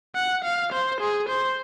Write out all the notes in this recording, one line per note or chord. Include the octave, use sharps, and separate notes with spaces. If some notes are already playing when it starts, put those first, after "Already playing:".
F#5
F5
C5
G#4
C5